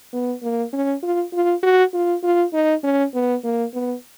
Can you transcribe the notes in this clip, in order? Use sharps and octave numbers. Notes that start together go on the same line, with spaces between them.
B3
A#3
C#4
F4
F4
F#4
F4
F4
D#4
C#4
B3
A#3
B3